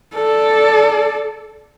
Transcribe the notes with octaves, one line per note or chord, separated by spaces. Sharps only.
A4 D5